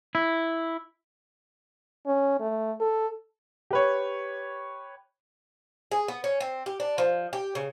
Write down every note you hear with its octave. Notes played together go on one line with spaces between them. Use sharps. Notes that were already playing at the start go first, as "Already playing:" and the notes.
E4
C#4
A3
A4
G4 B4 C#5
G#4
B3
C#4
C4
G4
D4
F3
G4
C#3